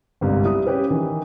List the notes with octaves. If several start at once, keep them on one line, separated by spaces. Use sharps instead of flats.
G1 C2 G#2
G3 E4 D#6
C#4 G4 B4
D#3 E3